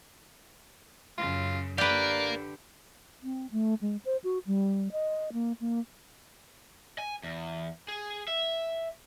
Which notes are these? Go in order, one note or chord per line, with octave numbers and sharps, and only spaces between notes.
F#2 C#3 F4
D3 G4 A#4 B4 D5 F5
C4
A3
G#3
C5
F#4
G3
D#5
A#3
A#3
G#5
E2
G#4
E5